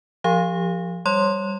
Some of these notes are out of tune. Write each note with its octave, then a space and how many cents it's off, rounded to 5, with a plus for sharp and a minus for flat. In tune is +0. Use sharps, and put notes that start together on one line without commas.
F3 +0 G4 +25 F5 +0
G3 +0 C#5 +0 C6 +0